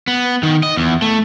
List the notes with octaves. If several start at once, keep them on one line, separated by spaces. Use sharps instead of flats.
B3
D#3
D#5
E2
A3